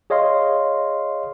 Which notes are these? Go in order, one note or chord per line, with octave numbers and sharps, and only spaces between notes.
G#4 C#5 D#5 F5 C6